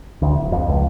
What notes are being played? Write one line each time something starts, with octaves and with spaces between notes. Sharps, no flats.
D2
D1
F2
C#2